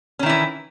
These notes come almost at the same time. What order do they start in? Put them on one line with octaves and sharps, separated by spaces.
C#4 D#3 E4 E3